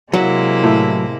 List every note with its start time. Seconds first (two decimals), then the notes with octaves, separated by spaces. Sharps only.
0.13 C3 F#3 G#3 A#3 E4
0.64 A2